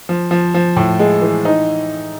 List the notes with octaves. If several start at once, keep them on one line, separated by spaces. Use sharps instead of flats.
F3
F3
F3
A2
G#3
E3
D#4